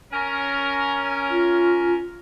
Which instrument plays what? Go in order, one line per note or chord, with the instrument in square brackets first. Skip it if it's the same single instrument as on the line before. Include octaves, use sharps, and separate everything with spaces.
[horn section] C#4 A#4
[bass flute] F4